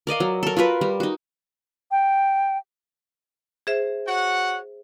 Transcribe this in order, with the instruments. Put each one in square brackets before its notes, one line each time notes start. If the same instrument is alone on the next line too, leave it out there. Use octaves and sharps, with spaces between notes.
[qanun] A#4 D5 D#5 F5
F#3
A4 A#4
F4 F#4 A#4 B4
G3 A#4
D#4 F#4
[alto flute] G5
[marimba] G#4 C5 E5
[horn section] F#4 C#5 F#5